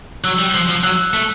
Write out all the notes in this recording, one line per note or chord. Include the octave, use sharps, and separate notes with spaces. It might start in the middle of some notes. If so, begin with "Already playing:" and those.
F#3 E6 F#6
G3
F3
F3
F#3 E6 F#6
A3